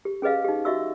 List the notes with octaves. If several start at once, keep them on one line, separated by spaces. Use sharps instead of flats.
G4
C#4 G#4 B4 D#5 F5
D#4 G4
F#4 D#5 E5 C#6 E6